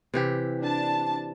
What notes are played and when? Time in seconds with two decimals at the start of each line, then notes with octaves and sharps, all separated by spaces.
0.14 C3 E3 G4
0.60 D4 A5